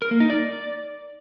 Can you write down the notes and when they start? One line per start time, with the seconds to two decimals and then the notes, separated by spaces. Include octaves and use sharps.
0.02 A#4
0.11 A#3
0.20 D#4
0.30 D5